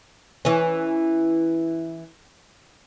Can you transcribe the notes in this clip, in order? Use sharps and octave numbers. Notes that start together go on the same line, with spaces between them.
E3 C#4